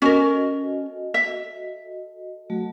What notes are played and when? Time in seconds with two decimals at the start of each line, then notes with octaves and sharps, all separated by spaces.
0.02 C#4 F#4 A4 A#4 D#5
1.14 E5
2.50 F#3 A3 F#4